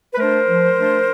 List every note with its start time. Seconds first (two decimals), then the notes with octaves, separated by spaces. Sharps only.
0.14 B4
0.18 A3 D4 A#4 C5
0.47 F3
0.77 A3 D4